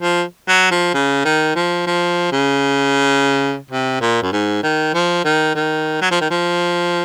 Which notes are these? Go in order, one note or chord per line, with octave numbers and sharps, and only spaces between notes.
F3
F#3
F3
C#3
D#3
F3
F3
C#3
C3
A#2
F#2
G#2
D#3
F3
D#3
D#3
F#3
F3
D#3
F3